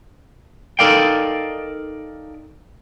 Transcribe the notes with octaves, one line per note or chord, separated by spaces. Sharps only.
D#4 A4 A#4 D5 F5 G5